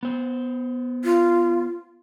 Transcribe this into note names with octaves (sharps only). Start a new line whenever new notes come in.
B3 C5
F4